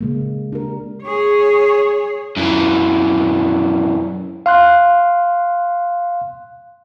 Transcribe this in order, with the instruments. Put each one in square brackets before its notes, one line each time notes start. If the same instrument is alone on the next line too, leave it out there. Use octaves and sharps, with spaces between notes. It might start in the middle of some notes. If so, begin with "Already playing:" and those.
[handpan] C#3 G#3 A#3
D4 G4 A#4
[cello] G#4 C#5
[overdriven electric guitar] F#2 E3
[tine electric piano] F5 C6 F#6